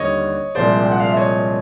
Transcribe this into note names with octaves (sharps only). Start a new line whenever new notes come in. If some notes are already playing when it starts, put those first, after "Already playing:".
Already playing: D#2 D3 G3 A#3 C#5 D#5
C2 A#2 F3 G#3 C5 D5
G5
F#5
F5
E5
C#5 D#5